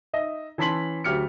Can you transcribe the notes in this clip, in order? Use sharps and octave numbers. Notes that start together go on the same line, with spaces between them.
D#4 D#5 E5
E3 C#4 A5 C6 B6 F#7
D2 F#3 G4 F6 C#7